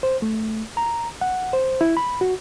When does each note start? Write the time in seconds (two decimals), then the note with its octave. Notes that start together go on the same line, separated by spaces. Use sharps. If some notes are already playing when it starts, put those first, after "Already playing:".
0.03 C5
0.22 A3
0.77 A#5
1.21 F#5
1.53 C5
1.81 E4
1.97 B5
2.21 F#4